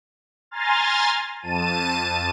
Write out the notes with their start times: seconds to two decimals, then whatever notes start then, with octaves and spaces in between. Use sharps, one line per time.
0.51 G#5 A#5 C6 F6 A6
1.42 F2 A5 D#7